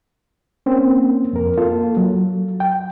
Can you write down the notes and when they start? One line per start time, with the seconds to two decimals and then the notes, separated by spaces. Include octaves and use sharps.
0.66 A#3 C4 C#4
1.33 F2 A#4
1.58 A#3 F4 A4
1.97 F#3
2.60 G5